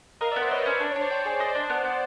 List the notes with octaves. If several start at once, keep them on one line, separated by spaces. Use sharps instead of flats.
A#4 D#5 F5
D5 E5
B3
A#4 C5
B4 C#5 D#5
C#4 C5 D5
D4 D5
D4 C#5
C5 D5
G5
G#4
C5 D5 D#5
D4
B3
B3